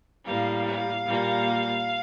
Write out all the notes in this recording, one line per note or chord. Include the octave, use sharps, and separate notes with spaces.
A2 G3 A#3 F5
F5
A#2 G3 A#3